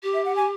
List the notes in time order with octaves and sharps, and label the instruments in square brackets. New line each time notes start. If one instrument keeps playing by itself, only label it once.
[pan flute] G4
[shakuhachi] E5
F#5
G#5